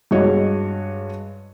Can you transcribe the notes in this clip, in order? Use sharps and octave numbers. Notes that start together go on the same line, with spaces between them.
G2 G#3 F#4 C#5 D#5